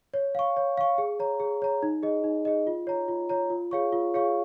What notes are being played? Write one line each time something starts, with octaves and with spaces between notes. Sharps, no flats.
C#5
F5 C#6
C#5
F5 C#6
G#4
C#5 A#5
G#4
C#5 A#5
D#4
G#4 D#5
D#4
G#4 D#5
F4
C#5 A#5
F4
C#5 A#5
F4
G#4 C#5 F5 C#6
F4
G#4 C#5 F5 C#6